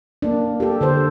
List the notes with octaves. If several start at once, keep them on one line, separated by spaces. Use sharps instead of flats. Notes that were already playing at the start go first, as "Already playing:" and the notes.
A#3 D4
G4 A4
D3 A4 C5